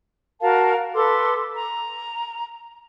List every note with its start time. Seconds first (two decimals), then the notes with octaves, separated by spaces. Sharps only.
0.41 F#4 A#4 F5 A5
0.96 A4 B4 C6 D6
1.55 A#5